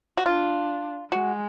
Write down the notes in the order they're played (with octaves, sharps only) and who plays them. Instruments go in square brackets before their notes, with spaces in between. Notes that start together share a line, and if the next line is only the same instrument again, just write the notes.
[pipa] F#4
[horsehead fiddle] D4 [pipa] F4
[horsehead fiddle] G#3 [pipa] F#4